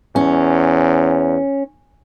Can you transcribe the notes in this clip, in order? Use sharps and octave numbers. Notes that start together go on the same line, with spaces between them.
E2 C#4